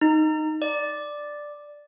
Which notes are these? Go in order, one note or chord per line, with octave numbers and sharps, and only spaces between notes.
D#4
D5